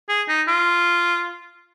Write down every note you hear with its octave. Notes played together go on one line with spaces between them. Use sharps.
G#4
D#4
F4